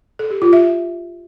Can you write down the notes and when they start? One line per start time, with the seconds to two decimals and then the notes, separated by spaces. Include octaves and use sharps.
0.19 A4
0.30 G4
0.42 F4
0.53 E5